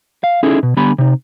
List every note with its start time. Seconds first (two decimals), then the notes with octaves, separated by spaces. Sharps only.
0.24 F5
0.43 C#4 D#4 E4 G#4 A4
0.63 B2
0.77 D3 G3 B3 G#5 B5
0.98 C3 D#4